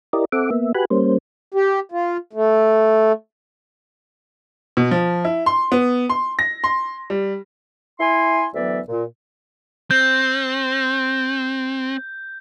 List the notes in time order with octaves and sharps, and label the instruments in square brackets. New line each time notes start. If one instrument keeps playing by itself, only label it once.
[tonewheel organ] E4 G4 A#4 D5 D#5
C4 A4 E5 F#5 D6
A#3 B3 E5
F#4 G4 B4 G#5 B5 F#6
G3 A#3 C#4 C5
[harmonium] G4
F4
A3
[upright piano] B2
F3
E4
C6
B3
C6
A#6
C6
G3
[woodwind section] E4 G#5 C6
D2 E3 F#3 B3 D5 E5
A#2
[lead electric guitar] C4 [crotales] G6